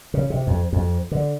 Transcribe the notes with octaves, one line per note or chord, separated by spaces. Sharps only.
C#3
C3
F2
F2
D3